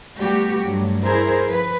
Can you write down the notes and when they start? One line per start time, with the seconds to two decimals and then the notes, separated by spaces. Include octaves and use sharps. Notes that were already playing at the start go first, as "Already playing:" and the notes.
0.18 G3 A3 B3 F#4 G4
0.64 G2 F#3 A3
1.04 E4 G#4 A#4 C5
1.47 F3 B4